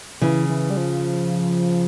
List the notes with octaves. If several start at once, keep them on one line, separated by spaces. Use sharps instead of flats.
C#3 E3
E3
G3
F3